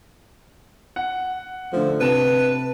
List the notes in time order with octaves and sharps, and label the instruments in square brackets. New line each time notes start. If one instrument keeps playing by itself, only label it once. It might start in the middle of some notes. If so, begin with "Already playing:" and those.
[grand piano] F#5
[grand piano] D3 A3 [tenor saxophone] F3
[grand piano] C3 A5 E7 [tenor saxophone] B4